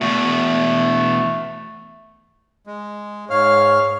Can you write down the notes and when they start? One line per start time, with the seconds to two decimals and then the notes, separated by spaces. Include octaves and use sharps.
0.01 E2 B2 A3
2.67 G#3
3.30 G#2 C#5 F5 F6